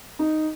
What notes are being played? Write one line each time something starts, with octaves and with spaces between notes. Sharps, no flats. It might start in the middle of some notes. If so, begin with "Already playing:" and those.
D#4